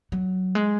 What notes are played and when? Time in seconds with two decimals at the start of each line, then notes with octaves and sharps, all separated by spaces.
0.12 F#3
0.55 G#3